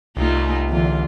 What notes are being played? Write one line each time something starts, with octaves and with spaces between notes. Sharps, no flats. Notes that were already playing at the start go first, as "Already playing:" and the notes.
C2 A3 D#4 F4
E2 D3 F4